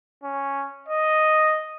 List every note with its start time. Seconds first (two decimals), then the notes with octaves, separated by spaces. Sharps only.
0.24 C#4
0.88 D#5